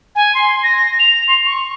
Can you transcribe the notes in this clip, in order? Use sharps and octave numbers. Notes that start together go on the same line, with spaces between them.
G#5
C6
A#6
F7
C6
C#6